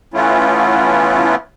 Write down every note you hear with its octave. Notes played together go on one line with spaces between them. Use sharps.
E3 A3 B3 C#4 E4 F4